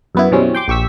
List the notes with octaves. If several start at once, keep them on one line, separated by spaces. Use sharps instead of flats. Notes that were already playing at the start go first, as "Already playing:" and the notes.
F#2 B3 E4
F#2 B2 E3 G3 C4 C#4
G5 C6 D6
A#1 G4 C#6 E6 B6